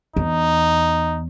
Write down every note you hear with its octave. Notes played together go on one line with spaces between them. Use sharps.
E2 D#4